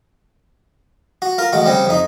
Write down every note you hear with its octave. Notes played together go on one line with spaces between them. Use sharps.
F#4
F4 A#4
A1 G#3 F#4
C#3 G3 C4
F2 D#4